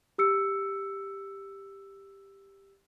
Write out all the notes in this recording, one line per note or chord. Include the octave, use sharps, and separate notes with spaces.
G4 E6 C#7